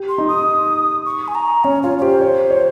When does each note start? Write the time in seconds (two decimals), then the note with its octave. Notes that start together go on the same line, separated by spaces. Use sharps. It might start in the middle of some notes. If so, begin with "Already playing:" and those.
Already playing: G4
0.09 C6
0.18 D#4
0.28 D#6
1.06 C#6
1.28 G#5
1.35 A#5
1.64 C#4 C#5
1.83 F4 C#5
1.98 C#5
2.02 G4 C5
2.21 C#5
2.51 C#5